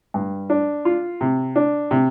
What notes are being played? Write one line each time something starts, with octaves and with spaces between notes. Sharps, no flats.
G2
D4
F4
C3
D4
C3